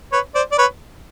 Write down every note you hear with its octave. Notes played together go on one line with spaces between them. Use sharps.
B4 C#5
C5 D5
D5
B4 C#5